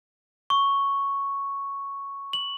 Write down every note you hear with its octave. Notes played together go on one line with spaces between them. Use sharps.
C#6
F#7